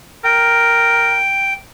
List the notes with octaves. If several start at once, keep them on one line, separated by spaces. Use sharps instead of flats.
A#4 G5